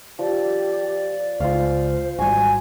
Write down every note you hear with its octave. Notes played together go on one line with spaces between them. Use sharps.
F3 G4 D5
C#2 F4 C5 F5
G#1 G3 F#4 G#5 C6